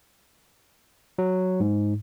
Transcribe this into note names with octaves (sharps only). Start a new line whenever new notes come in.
F#3
G#2